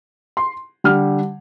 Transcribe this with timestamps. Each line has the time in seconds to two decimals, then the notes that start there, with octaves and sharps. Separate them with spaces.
0.37 C6
0.84 D3 G3 F6